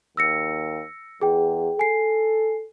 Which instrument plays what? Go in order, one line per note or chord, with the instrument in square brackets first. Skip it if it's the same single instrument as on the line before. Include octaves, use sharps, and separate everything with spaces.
[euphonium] D#2 [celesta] E6 A#6 C#7
[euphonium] E2 [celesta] G#4 G5
[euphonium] A4 [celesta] G#5 C7